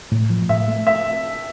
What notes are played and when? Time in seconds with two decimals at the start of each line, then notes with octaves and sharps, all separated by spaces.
0.12 A2
0.30 F3
0.49 A2 E5
0.68 A3
0.87 E5